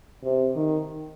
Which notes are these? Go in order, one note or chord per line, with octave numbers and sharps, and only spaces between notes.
C3
D#3